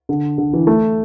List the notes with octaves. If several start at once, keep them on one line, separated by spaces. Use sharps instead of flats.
D3
D3
E3
A3